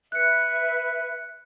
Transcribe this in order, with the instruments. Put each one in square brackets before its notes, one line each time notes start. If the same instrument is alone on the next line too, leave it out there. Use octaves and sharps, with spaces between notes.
[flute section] B4 E5 [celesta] F#6 C#7